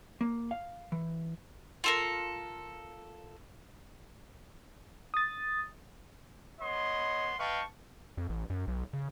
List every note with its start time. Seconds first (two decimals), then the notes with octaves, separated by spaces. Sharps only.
0.21 A#3
0.51 F5
0.92 E3
1.84 F4 A4 A#4
5.14 D#6 A6
6.61 B3 C#5 D#5 B5 C6
7.39 B4 D#5 F5 G5 A5 C#6
8.17 F2
8.29 A1
8.50 F#2
8.67 B1
8.93 C#3